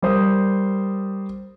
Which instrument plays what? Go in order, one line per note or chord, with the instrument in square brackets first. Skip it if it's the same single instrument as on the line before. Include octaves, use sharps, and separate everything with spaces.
[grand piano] G3 A#4 C5 D#6